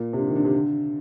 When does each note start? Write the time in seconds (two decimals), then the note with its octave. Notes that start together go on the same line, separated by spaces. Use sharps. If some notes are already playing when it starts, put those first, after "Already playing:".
Already playing: A#2
0.13 C3
0.19 D3
0.28 D#3
0.36 D3
0.45 C3
0.54 D3